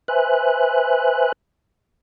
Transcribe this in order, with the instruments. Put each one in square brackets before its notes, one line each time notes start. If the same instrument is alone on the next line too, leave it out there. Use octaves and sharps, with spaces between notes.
[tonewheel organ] B4 C5 E5 G#5 F#6